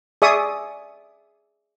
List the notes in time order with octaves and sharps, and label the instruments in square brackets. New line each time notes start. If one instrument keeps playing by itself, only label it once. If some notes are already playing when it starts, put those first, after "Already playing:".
[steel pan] G#4 D5 E5 C#6 D#6